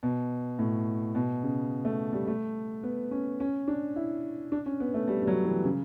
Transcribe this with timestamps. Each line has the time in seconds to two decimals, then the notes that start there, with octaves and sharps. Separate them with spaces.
0.03 B2
0.59 A2
1.15 B2
1.43 C#3
1.85 A3
2.13 G3
2.28 A3
2.83 B3
3.11 C#4
3.40 C#4
3.68 D4
3.96 E4
4.52 D4
4.66 C#4
4.80 B3
4.94 A3
5.08 G3
5.22 G3
5.27 F#3
5.45 E3
5.65 C#3